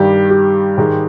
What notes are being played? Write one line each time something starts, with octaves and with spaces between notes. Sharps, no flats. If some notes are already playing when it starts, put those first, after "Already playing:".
Already playing: G2 D#3 G3 G4
G4
G#2 D#3 G#3